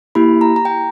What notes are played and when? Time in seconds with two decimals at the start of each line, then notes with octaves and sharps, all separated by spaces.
0.15 A#3 E4 G4 B5
0.41 A#5
0.56 A#5
0.65 G5